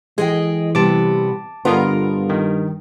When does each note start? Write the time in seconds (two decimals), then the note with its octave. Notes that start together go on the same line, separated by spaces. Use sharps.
0.18 E3 G#3 G#4 D#5 G5
0.75 C3 G3 B3 A5 D6
1.65 G2 D3 B3 F4 A#4 D#5
2.30 D#3